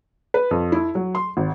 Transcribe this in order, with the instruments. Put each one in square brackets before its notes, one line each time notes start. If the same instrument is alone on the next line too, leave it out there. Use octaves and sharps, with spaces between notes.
[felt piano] B4
F2
E4
F#3
C6
G#1